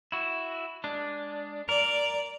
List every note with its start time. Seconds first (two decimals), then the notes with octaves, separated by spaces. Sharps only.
0.12 E4 F#4
0.84 G#3 D4
1.69 A#4 D5